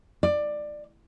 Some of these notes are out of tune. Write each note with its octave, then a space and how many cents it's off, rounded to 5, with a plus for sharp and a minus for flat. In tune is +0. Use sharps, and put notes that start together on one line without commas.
D5 +15